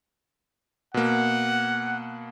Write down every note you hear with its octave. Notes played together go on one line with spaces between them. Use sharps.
B2 A#3 F#5